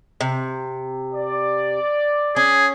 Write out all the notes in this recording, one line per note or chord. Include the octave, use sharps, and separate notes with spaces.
C3
D5
C#4 G#4